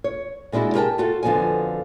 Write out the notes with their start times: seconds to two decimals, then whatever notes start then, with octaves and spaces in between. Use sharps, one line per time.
0.04 C#5
0.52 A#2 G#3 D4 E4 F#4
0.74 G4 G#4 A#4 B4 G5 A5
0.98 F4 F#4 A4
1.23 F2 D3 F3 B3 F#4 G#5